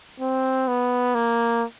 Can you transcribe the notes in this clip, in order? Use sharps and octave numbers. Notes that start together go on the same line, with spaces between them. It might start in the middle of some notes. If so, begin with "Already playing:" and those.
C4
B3
A#3